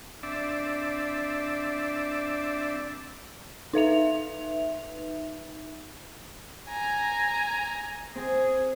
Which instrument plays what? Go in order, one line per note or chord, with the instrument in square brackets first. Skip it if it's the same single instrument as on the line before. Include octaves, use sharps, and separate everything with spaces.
[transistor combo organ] C4 D4 D5 E5
[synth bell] D#4 B4 E5 F7
[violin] G#5 A#5
[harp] C4 [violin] G#4